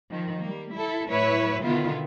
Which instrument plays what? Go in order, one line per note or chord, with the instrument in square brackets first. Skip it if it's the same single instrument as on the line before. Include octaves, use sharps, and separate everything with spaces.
[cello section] D#3 F3
G3 A#3
E4 A4
A2 F#3 E4 B4 C#5 E5
B2 D3 D#3 B3 E4 F4